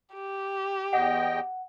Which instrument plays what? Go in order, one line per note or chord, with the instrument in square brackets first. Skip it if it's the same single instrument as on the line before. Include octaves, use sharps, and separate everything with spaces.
[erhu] G4
[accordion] E2 D#5 G5 [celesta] F#5